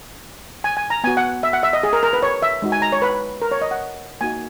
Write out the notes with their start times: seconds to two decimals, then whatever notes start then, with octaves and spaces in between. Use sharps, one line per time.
0.64 G#5
0.77 G#5
0.90 A#5
1.04 B3 F#4 G#5
1.17 F#5
1.43 E5
1.53 F#5
1.63 E5
1.73 D#5
1.83 G#4
1.93 A#4
2.03 A#4
2.13 B4
2.23 C#5
2.42 E5
2.62 G#3 D#4 F#4
2.72 G#5
2.82 A#5
2.92 C#5
3.02 B4
3.42 A#4
3.51 C#5
3.62 D#5
3.71 F#5
4.21 A#3 D#4 F#4 G#5